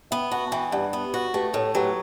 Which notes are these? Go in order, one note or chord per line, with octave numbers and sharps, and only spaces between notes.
B3 E5 G5
F#4 F#5 A5
A5
E3 E5 G5
G2 D5 F#5
B3
F#4
A3 G4 B4
A2 A4 C#5
F#3 G4 B4